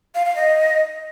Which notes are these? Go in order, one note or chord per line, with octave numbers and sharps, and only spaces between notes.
F5
F5
D#5